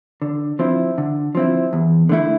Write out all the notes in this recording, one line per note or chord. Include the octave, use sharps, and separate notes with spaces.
D3
F3 C4 E4
D3
F3 C4 E4
E2
D3 A3 E4